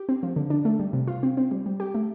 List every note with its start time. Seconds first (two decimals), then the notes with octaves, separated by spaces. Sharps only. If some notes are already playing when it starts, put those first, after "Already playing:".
Already playing: G4
0.09 C4
0.23 F3
0.36 D3
0.50 D4
0.65 A3
0.80 G3
0.93 C3
1.08 F4
1.23 C4
1.37 C4
1.51 G3
1.66 G3
1.80 G4
1.95 A3